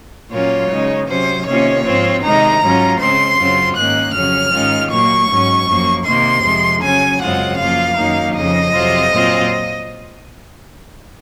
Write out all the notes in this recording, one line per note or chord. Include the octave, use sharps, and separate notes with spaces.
A#2 F#3 A#3 C#4 F4 C#5
C#3 G#3 D#4
C3 F#3 C#4 C5
C3 D#3 A#3 C#4 F4 C#5
G#2 F3 C4 F4
C3 D#3 G#3 D#4 A#5
G#2 F#3 C#4 F4
C#3 G#3 C4 C6
F#2 C#3 F#3 C4 F4
G#2 D#3 A#3 C#4 F#6
F2 C#3 F#3 C#4 F6
G#2 D#3 G#3 C#4 F4
A#2 F#3 A#3 C#6
G#2 F#3 C#4
F#2 F3 A#3
C3 D#3 A#3 C6
F2 C3 F3 G#3
C#3 F#3 C#4 G#5
F#2 C#3 G#3 C4 F4 F#5
F#2 F3 A#3 F4 F5
F#2 D#3 F#3 A#3 D#4
F2 C#3 F3 D#5
F2 C3 F#3 C4 F4
A#2 F#3 C4 F4